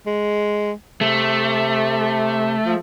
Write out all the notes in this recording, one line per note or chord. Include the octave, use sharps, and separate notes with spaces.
G#3
C3 A3
F3